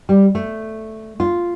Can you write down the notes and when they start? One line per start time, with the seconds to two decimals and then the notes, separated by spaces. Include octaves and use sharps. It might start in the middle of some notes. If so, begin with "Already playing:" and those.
0.09 G3
0.35 A3
1.20 F4